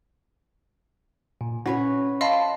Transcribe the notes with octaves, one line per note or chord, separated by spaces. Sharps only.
A#2
C#4 F#4 B4 C#5
D#5 F5 A5 B5 C6